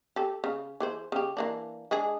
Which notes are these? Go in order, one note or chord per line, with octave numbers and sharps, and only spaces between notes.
G4 A4
C#3
E3 G#4 C5
C#3 G4
E3 A#3 D4
G#3 D4 G#4